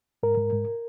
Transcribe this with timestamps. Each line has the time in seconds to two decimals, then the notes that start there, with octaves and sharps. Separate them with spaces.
0.23 G#2 A#4
0.37 G#2
0.53 G#2